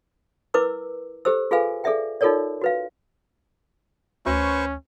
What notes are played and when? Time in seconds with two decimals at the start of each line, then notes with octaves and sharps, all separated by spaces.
0.54 E4 A#4 B4 D6 E6
1.25 G4 A4 C5 E6
1.51 F4 G#4 A4 B4 F5 G#5
1.84 G#4 A4 D5 E5 G5
2.21 D#4 F4 A4 A#4 C#5 D5
2.61 F#4 B4 F5
4.26 D2 C#4 B4 C5 C#6